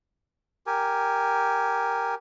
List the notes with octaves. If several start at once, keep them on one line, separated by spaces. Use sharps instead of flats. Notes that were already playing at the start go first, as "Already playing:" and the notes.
G4 A#4 G#5